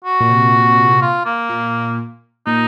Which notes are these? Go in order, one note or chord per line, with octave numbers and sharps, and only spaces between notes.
F#4
A#2
C3
F4
A#3
A#2
A#2 D#4